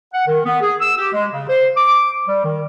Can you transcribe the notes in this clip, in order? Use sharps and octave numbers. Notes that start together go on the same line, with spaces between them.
F#5
D#3
B3
G#4
E6
G4
G#3
C#3
C5
D6
G3
D#3